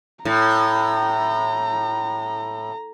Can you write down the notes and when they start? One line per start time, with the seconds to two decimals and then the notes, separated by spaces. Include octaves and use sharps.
0.25 A2 A#5